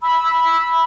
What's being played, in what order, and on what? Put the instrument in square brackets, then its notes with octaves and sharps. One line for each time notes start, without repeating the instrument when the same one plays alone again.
[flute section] B5 E6